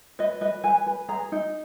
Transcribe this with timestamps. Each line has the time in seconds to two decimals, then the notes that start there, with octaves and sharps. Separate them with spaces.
0.19 B4 D#5
0.41 B4 D#5
0.64 B4 G#5
0.86 B4
1.09 G#4 A#5
1.32 D#4